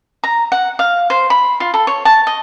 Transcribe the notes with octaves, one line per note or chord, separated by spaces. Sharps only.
A#5
F#5
F5
C5
B5
F4
A4
C#5
A5
D#5